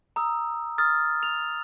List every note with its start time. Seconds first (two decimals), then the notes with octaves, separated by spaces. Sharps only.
0.16 A#5 D#6 E6
0.78 D#6 F6 A6
1.23 F7